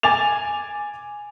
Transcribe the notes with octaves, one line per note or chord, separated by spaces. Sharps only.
G#5 D6 A6 F7